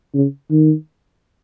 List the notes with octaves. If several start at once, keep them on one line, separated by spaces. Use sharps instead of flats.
C#3
D#3